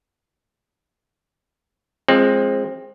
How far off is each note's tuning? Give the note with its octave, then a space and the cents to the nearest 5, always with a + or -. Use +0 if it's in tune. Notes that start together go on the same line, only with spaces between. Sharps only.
F3 +0 G#3 +0 C4 +20